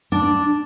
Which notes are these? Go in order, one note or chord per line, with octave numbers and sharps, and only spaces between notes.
D4